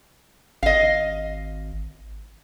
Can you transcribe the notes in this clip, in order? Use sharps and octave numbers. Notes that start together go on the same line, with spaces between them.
G#1 D#5 F5